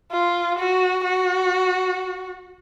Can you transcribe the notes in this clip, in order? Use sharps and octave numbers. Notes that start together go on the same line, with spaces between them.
F4
F#4
F#4